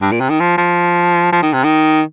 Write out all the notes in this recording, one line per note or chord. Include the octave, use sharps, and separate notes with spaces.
G2
A#2
C3
D#3
F3
F3
F3
D#3
C3
D#3